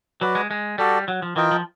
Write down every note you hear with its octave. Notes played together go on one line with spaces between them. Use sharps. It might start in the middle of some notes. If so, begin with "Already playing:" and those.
F#3 F#4 B4 D5
G#3
G#3
G3 F#4 A4 D5
F#3
F3
E3 F4 A#4 D#5 G5
F3